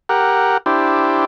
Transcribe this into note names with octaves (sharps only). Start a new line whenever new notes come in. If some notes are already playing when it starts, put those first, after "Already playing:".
G4 A#4 F#5
D4 E4 G4 C5